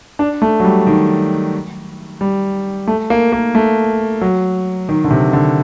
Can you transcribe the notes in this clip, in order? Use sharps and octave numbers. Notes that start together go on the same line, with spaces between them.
D4
A3
F#3
G3
D#3
G3
A3
A#3
A#3
A3
F#3
D#3
D3
C3
D3